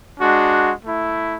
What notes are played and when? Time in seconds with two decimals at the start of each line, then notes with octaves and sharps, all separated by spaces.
0.20 G#3 D4 F#4
0.85 A3 E4